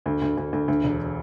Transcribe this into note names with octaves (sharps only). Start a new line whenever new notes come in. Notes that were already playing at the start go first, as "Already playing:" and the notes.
D2
D2
D2
D2
D2
E1